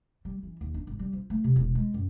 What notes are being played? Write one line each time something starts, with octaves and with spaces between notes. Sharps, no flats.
G3
E3
D#2
D4
G#1
G3
F3
A3
C3
E1
G#3
F#2